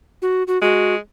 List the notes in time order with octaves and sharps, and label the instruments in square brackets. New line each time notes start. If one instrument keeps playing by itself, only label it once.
[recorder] F#4
F#4
[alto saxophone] G#3 [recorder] F#4